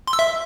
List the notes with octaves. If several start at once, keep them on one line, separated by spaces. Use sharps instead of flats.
C6
E6
E5